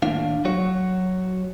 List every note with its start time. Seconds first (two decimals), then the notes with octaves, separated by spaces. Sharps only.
0.02 D#2 A2 D4 F5
0.45 F#3 F#4 C#5